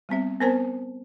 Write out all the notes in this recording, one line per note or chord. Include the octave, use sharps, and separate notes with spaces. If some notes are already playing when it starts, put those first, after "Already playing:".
G3 B3 C4 E5
B3 C4 A#4 C5 G#5 A5